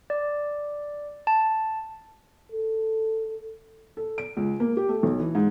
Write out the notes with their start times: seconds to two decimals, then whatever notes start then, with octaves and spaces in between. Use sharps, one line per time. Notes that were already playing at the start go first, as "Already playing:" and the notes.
0.10 D5
1.27 A5
2.52 A4
3.97 A4
4.18 D7
4.37 C#2
4.60 A#3
4.77 G4
4.89 A3
5.03 B1
5.20 E3
5.35 G#2